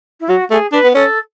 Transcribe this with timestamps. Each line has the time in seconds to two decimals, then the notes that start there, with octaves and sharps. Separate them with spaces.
0.20 E4
0.29 F#3 F#4
0.51 A3 G#4
0.72 D4 B4
0.84 B3
0.95 C#4 A4